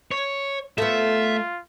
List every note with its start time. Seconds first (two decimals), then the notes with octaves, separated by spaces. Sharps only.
0.11 C#5
0.78 A3 B3 F4 E5